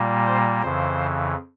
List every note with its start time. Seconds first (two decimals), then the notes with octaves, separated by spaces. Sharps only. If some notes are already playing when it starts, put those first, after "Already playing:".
Already playing: A#2 G3 A#3
0.26 C5
0.62 F2 C#3 E3 C5